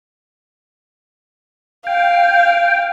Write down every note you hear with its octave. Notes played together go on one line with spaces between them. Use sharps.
F5 G5